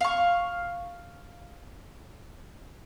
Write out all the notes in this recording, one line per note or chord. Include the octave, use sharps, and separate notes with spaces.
F5 C#6